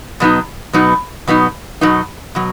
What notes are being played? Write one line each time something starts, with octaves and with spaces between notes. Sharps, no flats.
B2 F#3 B3 D#4
B2 F#3 B3 D#4
B2 F#3 B3 D#4
B2 F#3 B3 D#4
B2 F#3